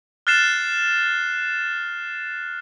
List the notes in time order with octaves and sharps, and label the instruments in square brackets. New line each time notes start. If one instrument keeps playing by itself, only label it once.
[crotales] F6 F#6 A6 C7 E7